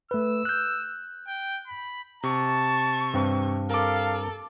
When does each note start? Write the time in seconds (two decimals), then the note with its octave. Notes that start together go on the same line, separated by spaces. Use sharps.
0.11 A3 B4 E6
0.45 F#6 G6
1.27 G5
1.67 B5
2.23 C3 A5 C#6
3.14 G2 C4 B4
3.70 A4 A#4 F5 D6